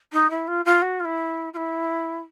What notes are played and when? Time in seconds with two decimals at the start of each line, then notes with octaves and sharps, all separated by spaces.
0.13 D#4
0.30 E4
0.48 F4
0.65 F4
0.82 F#4
1.00 F4
1.05 E4
1.53 F4
1.57 E4